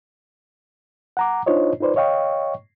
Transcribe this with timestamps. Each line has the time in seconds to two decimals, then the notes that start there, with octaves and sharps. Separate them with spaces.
1.17 F#5 A#5 D6
1.46 D4 D#4 F4 C5 C#5 D#5
1.80 D#4 F4 B4 C5 D5
1.96 C#5 D#5 F5 G5 C#6